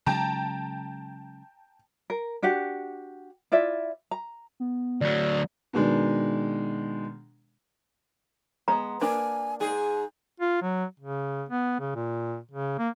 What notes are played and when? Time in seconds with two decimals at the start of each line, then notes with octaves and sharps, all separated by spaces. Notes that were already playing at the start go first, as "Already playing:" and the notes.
0.06 C#3 F#3 G#3 G5 A5 A#5
2.10 A#4
2.42 D4 F#4 G4 F#5
3.52 E4 F4 D5 E5
4.11 A#5
4.60 B3
5.01 D2 F#3 D5
5.73 B2 D#3 G#3 D4
8.68 G#3 B3 A#5
9.01 A#3 D4 B4 G#5
9.60 G#2 G#4 G#5
10.40 F4
10.62 F#3
11.00 C#3
11.49 B3
11.80 C#3
11.95 A#2
12.51 C#3
12.79 A#3